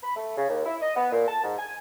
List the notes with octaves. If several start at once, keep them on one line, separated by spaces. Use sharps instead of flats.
B5
A3
C#3
D#2
E4
D#5
B3
A#2
A5
G#2
G#5